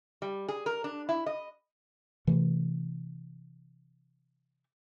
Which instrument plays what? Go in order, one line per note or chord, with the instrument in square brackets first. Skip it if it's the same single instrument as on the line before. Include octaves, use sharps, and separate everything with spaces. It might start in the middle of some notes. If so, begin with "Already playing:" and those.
[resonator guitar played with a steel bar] G3
G#4
A#4
D4
E4
D#5
[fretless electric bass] C3 E3 A3